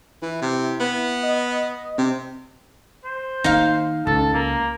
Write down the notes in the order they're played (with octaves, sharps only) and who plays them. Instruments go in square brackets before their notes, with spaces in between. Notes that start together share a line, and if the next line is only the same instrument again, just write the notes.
[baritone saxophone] E3 [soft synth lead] E4
[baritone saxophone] C3
B3
[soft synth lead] D#5
[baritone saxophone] C3 [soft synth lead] C4
[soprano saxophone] C5
[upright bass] D#3 A#3 [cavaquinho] D#4 F5
[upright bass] C#2 C#3 [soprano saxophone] A4
[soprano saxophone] A#3